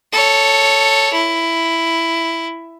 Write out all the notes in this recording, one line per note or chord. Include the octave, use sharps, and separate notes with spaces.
A4 C#5
E4